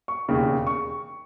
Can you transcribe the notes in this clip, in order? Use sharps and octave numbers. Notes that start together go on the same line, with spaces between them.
C#6
E1 D#2 C#3
C#6